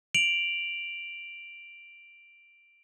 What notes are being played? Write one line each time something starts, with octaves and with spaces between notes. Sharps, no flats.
D7 F7 F#7